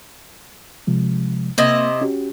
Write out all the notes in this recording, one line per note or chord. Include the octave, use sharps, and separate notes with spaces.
C3 F3 G#3
C3 A#3 E4 D#5
C#4 F#4 G4